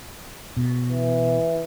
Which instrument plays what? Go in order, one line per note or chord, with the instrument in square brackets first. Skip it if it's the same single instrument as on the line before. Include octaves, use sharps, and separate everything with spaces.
[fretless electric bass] B2
[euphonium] E3